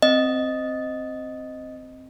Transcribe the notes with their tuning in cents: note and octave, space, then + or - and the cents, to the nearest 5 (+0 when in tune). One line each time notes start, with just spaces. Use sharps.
C4 +0 D#5 +0